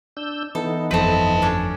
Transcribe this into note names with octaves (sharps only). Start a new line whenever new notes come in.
D4 E6 G6
E3 B3 D#4 A4
G1 F2 F3 A3 C4 B4 A5
C#4 D4